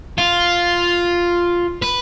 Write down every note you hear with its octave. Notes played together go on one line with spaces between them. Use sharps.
F4
B4